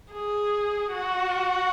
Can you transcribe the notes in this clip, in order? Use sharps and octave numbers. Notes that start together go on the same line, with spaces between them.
G#4
F#4